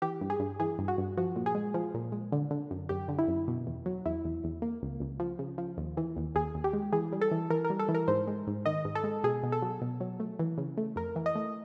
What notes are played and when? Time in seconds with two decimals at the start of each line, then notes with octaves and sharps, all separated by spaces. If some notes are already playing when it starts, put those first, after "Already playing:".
0.02 E3 G4
0.21 G2
0.30 G#4
0.39 G2
0.60 E3 G#4
0.79 G2
0.88 F#4
0.98 G2
1.17 F3 F#4
1.36 A#2
1.46 G#4
1.55 G#3
1.74 F3
1.94 A#2
2.12 G#3
2.32 D3
2.51 D3
2.71 F#2
2.89 F#2 G4
3.08 D3
3.18 E4
3.28 F#2
3.48 B2
3.67 E2
3.86 F#3
4.06 E2 E4
4.25 E2
4.44 E2
4.62 A#3
4.82 C#2
5.00 C#2
5.20 F3
5.39 C#3
5.58 F3
5.77 D#2
5.97 E3
6.17 D#2
6.35 D#2 G#4
6.55 D#2
6.64 G4
6.73 G#3
6.93 E3 G#4
7.12 G3
7.21 A4
7.31 E3
7.50 E3 A#4
7.65 A#4
7.70 G3
7.79 A4
7.89 E3
7.95 A#4
8.08 G#2 C5
8.27 G#3
8.47 G#2
8.66 D#3 D#5
8.85 G#2
8.95 A4
9.04 G#3
9.24 B2 G#4
9.43 B2
9.52 A4
9.62 F#3
9.81 B2
10.00 F#3
10.20 A3
10.39 E3
10.58 C#3
10.78 A3
10.96 F2 A#4
11.16 E3
11.26 D#5
11.35 A3